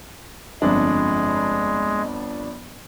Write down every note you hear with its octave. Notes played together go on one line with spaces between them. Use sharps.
G1 F2 G#3 D4